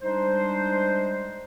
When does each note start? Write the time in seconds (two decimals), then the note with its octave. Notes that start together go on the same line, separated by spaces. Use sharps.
0.02 G3 G#3 D4 D#4 C5